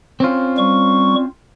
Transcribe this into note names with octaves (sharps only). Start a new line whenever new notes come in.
C4 C#4 F4
G3 C#6